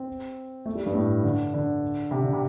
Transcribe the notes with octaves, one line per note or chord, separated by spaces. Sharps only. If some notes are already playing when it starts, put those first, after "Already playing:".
Already playing: C4
A3
G3
G2
A2
D3
D3
C3
D3
C3